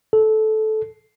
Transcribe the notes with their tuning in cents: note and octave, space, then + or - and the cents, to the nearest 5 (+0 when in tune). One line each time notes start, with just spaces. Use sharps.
A4 -15